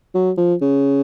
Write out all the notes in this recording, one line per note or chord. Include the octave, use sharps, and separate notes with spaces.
F#3
F3
C#3